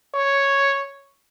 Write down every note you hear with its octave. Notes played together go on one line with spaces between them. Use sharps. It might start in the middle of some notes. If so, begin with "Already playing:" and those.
C#5